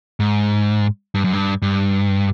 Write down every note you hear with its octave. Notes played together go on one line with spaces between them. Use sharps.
G#2
G2
F#2
G2
G2